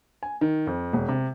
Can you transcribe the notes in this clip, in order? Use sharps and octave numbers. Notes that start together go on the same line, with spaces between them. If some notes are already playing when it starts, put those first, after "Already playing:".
G#5
D#3
F2
E1
C3